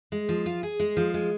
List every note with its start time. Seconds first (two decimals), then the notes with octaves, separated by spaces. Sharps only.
0.12 G#3
0.29 F3
0.46 F4
0.63 G#4
0.80 G#3
0.97 F3
1.14 G#3